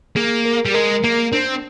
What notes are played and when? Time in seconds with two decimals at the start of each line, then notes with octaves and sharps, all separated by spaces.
0.16 A#3 G#4
0.46 A#4
0.66 G3
0.74 G#3 A#4
1.04 A#3 A#4
1.33 C4 D4